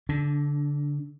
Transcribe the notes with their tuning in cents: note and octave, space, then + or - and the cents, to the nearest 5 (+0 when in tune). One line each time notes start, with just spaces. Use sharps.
D3 -25 D4 +0